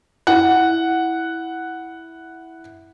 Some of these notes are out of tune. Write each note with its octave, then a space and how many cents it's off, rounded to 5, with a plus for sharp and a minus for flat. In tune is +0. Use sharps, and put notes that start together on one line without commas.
E4 -5 F#5 +0